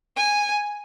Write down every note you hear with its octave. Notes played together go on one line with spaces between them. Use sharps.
G#5